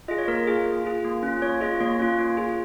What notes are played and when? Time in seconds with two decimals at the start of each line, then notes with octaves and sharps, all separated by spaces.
0.08 F4 G#4 D#5
0.18 C#5
0.28 A#3 A#4
0.47 F4 G#4
0.66 A#3
0.84 F4 G#4
1.05 A#3
1.23 C#4 F4
1.42 A#3 C#5
1.61 F4 G#4 D#5
1.80 A#3 C#5
1.99 C#4 F4
2.18 A#3 C#5
2.37 F4 G#4